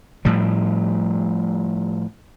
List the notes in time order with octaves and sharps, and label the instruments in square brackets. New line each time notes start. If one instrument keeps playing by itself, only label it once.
[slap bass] A2 F3 G3